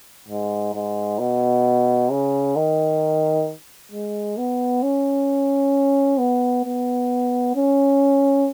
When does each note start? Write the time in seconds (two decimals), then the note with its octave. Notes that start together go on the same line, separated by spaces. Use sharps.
0.28 G#2
0.75 G#2
1.19 B2
2.11 C#3
2.56 D#3
3.91 G#3
4.37 B3
4.83 C#4
6.19 B3
6.65 B3
7.55 C#4